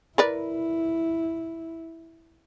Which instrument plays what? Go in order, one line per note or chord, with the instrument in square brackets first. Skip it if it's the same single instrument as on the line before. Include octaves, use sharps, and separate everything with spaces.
[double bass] E4 [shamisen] A#4 B4 D5